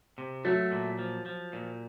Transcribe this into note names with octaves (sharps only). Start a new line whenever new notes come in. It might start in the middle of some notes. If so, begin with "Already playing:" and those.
C3
F#3 A3
A#2
F3
F3
A#2